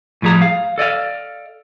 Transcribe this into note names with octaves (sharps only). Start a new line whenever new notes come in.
A2 F3 G3 G#4 A#5
F5
A4 D5 D#5 F5